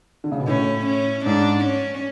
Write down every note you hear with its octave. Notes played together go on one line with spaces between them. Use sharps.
D3
C#3
B2
A2 C#4
C#4
G#2 D4
C#4